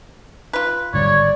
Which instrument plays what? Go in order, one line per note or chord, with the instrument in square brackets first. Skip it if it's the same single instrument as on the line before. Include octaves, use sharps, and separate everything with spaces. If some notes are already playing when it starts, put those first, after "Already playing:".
[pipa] F4 B4
[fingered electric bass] G#1 D3 G3 [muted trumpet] C#5 [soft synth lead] D5